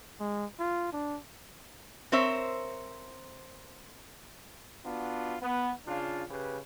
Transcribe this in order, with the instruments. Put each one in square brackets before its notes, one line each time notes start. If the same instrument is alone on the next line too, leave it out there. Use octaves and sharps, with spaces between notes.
[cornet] G#3
F4
D4
[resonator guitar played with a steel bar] C4 A#4 C5 C#5 E5
[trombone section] B3 D4 F4 F#4
B3
C#3 D4 F4
C#3 G4 B4